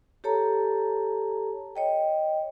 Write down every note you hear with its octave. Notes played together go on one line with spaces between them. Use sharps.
G4 A4 C#5 A5 A#5
C#5 D#5 G5